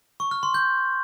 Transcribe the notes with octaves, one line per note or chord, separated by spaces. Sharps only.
C#6
F6
C6
G6